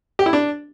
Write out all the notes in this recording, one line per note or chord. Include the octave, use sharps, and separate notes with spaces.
G4
E4
D4